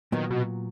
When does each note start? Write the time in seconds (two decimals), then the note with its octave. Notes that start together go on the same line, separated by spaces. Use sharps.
0.12 A#2 D#3 F#3 B3
0.30 B2